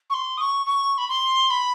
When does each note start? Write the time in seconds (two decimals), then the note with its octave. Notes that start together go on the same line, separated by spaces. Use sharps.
0.10 C#6
0.14 C6
0.37 D#6
0.41 C#6
0.66 C#6
0.98 B5
1.09 C6
1.50 B5